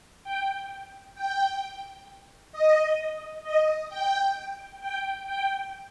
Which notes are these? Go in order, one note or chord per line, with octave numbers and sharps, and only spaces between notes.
G5
G5
D#5
D#5
G5
G5
G5